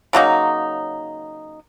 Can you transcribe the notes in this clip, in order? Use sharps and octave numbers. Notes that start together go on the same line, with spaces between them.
C#3 F#3 A#3 D#4